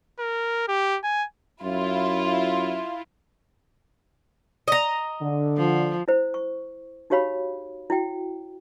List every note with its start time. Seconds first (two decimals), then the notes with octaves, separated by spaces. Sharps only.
0.19 A#4
0.68 G4
1.04 G#5
1.62 F#2 E4 F4
4.68 D#5 A#5
5.21 D3
5.57 F3
6.08 E4 C5
6.34 C#6
7.10 D#4 F#4 G4 C#5 F5 B5
7.90 E4 F#4 G5